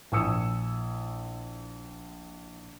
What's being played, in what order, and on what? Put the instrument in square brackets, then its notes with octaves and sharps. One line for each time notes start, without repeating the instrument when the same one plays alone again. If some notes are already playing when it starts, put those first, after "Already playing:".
[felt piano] A#1 E4 G#5 D#6 E6 C#7